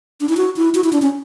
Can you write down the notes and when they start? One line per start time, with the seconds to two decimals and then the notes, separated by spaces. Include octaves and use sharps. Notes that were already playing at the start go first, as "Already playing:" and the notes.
0.21 D4
0.29 E4
0.37 F#4
0.57 E4
0.75 F#4
0.84 E4
0.93 D4
1.02 C#4